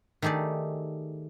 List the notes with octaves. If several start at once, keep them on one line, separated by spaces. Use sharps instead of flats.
D#3 A3 G4 G#4 D5